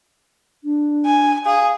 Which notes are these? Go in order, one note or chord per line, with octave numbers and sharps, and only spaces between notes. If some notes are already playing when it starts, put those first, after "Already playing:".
D4
G#5
G#4 F5